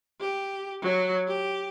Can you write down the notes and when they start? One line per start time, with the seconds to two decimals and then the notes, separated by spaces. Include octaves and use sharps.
0.20 G4
0.82 F#3
1.27 G4